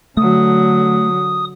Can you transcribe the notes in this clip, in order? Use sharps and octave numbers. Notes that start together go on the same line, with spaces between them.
D3 F#3 A3 D#6